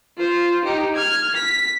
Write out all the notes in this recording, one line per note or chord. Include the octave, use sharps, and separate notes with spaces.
F4 C5
D#4 G4
F6 G#6
B6